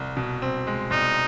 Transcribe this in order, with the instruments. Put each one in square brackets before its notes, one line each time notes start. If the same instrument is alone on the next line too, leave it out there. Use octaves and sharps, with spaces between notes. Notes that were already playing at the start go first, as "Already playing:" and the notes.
Already playing: [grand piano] C2
B2
C4
G#3
[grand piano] C2 [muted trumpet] D#4